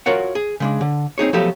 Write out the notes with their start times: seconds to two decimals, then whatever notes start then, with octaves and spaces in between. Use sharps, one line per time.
0.06 F4 F#4 A#4 C#5 F#5
0.35 G#4
0.60 C#3 G#3 D4
0.81 D3
1.18 C4 D#4 G#4 C#5
1.33 F3 F#3 A3 B3 G4 A4